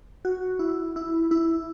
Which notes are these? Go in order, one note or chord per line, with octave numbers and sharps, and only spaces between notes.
F#4
E4
E4
E4